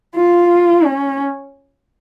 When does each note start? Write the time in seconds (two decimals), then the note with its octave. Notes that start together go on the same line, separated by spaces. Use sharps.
0.15 F4
0.85 C#4